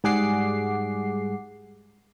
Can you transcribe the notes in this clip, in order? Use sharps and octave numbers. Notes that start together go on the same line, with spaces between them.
G#2 G3 G#4 F#5 D6 C7